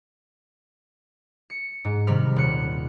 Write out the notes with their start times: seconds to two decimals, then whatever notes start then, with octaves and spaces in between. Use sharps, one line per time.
1.50 C#7
1.85 G#2
2.07 C3 D#3 G3 B5 F6
2.36 D#1 F#6 C#7